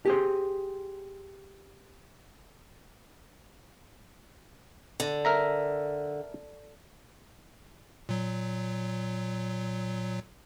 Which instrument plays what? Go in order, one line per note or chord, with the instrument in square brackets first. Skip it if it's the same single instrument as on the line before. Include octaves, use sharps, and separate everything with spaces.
[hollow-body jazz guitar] G4 G#4 C5
[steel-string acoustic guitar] D3
[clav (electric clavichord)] A#4 E5 A#5
[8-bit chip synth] A#2 F#3